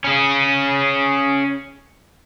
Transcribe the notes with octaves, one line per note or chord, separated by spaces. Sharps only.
C#4 G#4